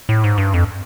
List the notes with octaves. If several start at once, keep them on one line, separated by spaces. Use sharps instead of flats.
A2
G#2
G2
F2